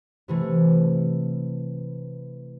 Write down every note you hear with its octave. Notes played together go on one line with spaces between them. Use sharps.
C3 E3 A3